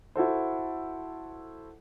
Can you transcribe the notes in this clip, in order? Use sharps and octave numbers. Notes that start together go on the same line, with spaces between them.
E4 F#4 A4 C5